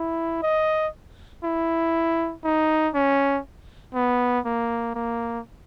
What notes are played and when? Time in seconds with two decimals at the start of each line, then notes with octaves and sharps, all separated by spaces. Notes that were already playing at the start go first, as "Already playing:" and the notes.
Already playing: E4
0.42 D#5
1.44 E4
2.44 D#4
2.94 C#4
3.94 B3
4.45 A#3
4.95 A#3